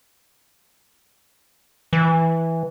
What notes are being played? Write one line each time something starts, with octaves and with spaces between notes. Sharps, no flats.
E3